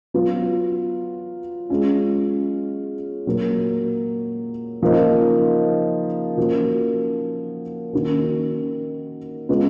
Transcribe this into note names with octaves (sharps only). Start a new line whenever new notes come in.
F#3 B3 F4
G#3 C#4 F4
A#2 F#3 A#3
C#3 F3 A#3 D#4
F3 A#3 C#4 F#4
D#3 A#3 C#4 F#4
C#3 G#3 B3 F4